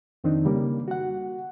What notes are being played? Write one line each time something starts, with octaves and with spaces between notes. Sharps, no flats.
F2 D#3 C4 D4 D#4
C#3 G3 A#3
F#4 F#5